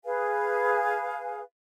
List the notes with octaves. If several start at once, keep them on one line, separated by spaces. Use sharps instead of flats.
G#4 B4 F5 G#5